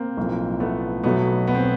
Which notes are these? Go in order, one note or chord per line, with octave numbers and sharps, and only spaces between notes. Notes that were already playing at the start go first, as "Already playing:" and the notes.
Already playing: A#3 C4
B1 A2 F3
A3 B3
B1 B2 F#3 A3 B3
B3
C4